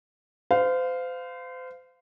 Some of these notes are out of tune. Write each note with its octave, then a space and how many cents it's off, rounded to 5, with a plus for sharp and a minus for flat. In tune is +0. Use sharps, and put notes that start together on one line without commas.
C5 -35 F5 +0